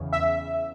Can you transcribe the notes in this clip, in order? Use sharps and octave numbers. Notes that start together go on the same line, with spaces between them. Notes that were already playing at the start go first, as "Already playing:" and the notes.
Already playing: E2 C#3
E5